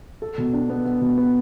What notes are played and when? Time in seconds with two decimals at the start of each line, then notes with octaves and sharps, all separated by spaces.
0.22 A4
0.38 B2
0.53 D4
0.70 B3
0.85 B3
1.01 B2
1.18 B3